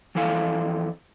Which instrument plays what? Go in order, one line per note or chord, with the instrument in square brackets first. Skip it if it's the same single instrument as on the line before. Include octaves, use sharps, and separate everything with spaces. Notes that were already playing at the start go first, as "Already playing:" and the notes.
[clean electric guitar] F2 E3 E4 A4 F5